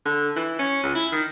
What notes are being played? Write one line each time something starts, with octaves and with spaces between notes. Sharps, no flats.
D3
E3
C#4
C#2
E4
D#3